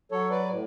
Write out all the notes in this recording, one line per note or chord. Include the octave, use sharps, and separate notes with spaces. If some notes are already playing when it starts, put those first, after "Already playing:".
F#3 A4 C#5
B4 D5
A2